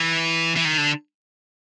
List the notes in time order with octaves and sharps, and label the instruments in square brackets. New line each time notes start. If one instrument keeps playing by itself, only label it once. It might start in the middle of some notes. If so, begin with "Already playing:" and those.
Already playing: [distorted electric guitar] E3
E3
D#3
D3